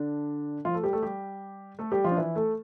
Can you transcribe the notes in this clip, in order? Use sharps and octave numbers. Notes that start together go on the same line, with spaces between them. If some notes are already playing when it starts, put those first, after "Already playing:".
Already playing: D3 D4
F3 F4
A3 A4
G3 G4
A3 A4
G3 G4
A3 A4
G3 G4
F3 F4
D4
E3 E4
A3 A4